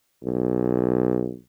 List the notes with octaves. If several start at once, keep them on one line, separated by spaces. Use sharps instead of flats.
B1